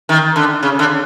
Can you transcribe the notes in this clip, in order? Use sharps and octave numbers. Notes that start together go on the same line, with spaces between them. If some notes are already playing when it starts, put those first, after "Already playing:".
D#3
D3
C#3
D3